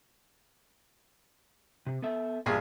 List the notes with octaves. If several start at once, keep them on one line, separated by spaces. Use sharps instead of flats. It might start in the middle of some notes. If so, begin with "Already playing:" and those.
C3
B3 A4 E5
A#1 G2 G#4